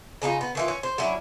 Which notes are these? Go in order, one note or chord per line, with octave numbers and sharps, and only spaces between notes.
C#3 D4 D#4 F4
B3
D#3 E3 F4
C#4
C5
F#3 C#4 D4 E4